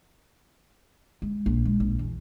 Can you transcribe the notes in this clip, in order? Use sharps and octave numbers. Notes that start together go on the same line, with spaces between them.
G#3
A#1
G#3
A#1
E2